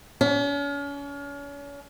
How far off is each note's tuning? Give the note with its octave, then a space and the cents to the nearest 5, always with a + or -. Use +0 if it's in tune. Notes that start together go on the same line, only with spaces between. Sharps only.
C#4 +40